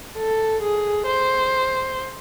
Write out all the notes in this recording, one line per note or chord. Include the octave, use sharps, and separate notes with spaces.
A4
G#4
C5